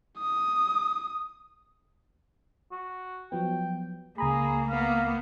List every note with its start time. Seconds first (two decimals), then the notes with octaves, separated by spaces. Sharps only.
0.19 D#6
2.71 F#4
3.32 F3 F#3 B3 G5
4.18 C#2 A#3 G#4 A#5 B5
4.69 A#3 B3 F5